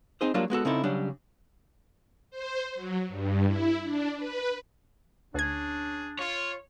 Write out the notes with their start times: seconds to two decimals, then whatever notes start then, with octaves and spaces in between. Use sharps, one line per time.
0.21 C4 D#4 G#4 C5
0.34 F#3 G3 A#3 D4 F4
0.50 G#3 B3 F#4 A4
0.65 C#3 C4 D#4 E4 A4
0.84 C#3 F#3 G3 D4
2.30 C5
2.75 F#3
3.08 G2
3.46 E4
3.83 D4
4.16 B4
5.34 D2 C#4 D4 G#4 G#6
6.19 F4 C#5